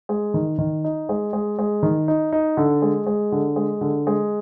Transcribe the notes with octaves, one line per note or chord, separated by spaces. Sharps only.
G#3
D#3
D#3
D#4
G#3
G#3
G#3
D#3
D#4
D#4
D3
G#3
G#3
D3
G#3
D3
G#3